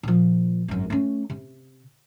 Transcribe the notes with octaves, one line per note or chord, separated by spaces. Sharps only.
A#2 F3
G#1 F#2
A3 C#4
C3